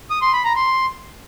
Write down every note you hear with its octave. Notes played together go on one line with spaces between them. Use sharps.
D#6
C6
B5
A#5
C6